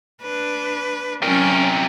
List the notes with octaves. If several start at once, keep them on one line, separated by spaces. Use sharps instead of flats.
D4 B4
C3 F#3 C#4 A#4